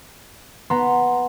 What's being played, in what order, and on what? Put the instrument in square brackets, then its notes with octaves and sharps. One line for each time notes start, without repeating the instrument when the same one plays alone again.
[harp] B3 [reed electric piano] A#5 C6